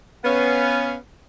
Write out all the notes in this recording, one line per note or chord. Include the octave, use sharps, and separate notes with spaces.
B3 C#4 F5